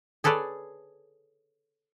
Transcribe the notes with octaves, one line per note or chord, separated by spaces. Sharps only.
G#4 A4 B4 C#5 D5